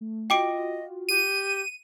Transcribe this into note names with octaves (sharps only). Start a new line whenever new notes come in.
A3
F4 F#4 D#5 G5 D6 D7
G4 D#7